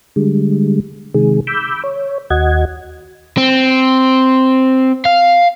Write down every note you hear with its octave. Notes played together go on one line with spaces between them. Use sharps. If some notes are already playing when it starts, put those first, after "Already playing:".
D3 G3 G#3
C3 D#3 G#3 G#4
B5 D6 E6 G6
C#5
D#2 F#4 D#5 F#5 G#6
C4
F5